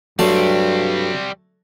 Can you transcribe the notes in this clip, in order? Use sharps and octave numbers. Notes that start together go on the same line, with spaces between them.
G2 F#3 G3 A3 C4 D5